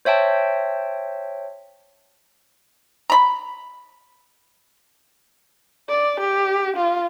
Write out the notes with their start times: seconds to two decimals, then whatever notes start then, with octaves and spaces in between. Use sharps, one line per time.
0.05 C5 C#5 E5 G5 A5
3.10 A#5 B5
5.89 D5
6.20 G4
6.77 F4